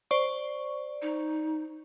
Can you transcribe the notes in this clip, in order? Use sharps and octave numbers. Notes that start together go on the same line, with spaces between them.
C5 D5 C#6
D#4